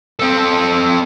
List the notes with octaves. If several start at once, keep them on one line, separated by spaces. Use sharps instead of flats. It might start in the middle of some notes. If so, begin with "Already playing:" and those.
C4 A4